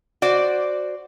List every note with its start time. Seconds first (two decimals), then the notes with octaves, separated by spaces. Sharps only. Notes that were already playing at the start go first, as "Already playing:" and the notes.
0.22 F#4 C5 D5